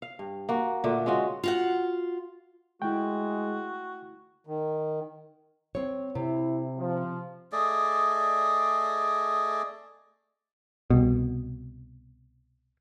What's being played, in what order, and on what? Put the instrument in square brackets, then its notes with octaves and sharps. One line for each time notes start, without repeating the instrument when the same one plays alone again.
[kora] F5
G2
A#3 F#4
A#2 D3 A3 D4
G#3 C#4 F4 F#4
[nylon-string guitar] F4 F#4 F#5
[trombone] G#3 [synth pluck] A3 E4 [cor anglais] F#4 [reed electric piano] G5
[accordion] D#3
[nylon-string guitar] C4 C#5
[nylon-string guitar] C3 [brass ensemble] E4
[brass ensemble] F3
[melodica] A3 G#4 D5 D#5
[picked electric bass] C2 B2